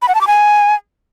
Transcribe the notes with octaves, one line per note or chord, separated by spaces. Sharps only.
B5
F#5
A5
D6
G#5